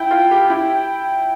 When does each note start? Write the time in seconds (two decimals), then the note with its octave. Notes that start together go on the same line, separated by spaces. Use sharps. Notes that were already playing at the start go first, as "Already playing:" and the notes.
Already playing: E4 G5
0.11 F4
0.31 G4
0.50 E4 G5